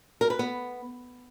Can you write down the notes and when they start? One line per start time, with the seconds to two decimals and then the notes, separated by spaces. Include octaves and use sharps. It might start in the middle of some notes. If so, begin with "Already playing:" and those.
0.21 A#4
0.30 B4
0.39 B3